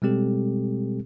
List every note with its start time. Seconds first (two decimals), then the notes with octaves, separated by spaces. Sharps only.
0.02 B2 G3 G#3 C4 G4 A4